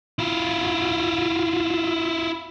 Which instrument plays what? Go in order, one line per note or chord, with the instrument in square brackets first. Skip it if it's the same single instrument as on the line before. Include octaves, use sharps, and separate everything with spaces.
[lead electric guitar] E4 F4